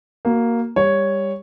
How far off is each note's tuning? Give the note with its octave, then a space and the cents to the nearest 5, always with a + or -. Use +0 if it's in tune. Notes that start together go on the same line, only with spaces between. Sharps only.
A#3 +0 F#4 +15
G3 +20 C#5 +0